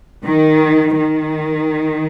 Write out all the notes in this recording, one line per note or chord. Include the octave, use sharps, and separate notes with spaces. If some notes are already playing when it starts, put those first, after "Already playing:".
D#3
D#3